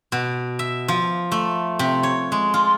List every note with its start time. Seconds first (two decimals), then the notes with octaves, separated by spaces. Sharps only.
0.12 B2
0.59 E5
0.88 F3
1.32 A3
1.79 C3
2.03 C#5
2.32 G#3
2.54 F4